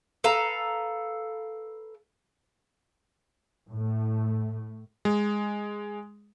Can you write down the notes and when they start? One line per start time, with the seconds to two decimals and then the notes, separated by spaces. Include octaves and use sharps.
0.24 A4 B4 F5 A#5
3.70 A2 A3
5.05 G#3